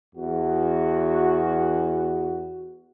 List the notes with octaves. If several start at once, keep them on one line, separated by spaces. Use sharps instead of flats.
E2 F#4